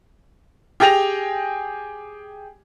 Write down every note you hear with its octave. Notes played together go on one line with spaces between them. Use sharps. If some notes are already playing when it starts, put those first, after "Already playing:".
G4 G#4 G5 A#6 F7